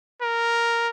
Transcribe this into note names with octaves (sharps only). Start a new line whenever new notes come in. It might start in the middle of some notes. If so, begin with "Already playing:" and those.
A#4